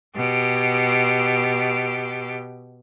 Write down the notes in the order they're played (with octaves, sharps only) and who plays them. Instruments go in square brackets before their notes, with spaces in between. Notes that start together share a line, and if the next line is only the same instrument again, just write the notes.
[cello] B2 G4